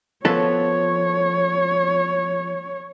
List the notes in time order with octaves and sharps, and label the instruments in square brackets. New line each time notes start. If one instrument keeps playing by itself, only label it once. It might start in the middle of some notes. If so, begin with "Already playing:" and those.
[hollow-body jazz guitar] F3 B3 A4 [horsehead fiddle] C#5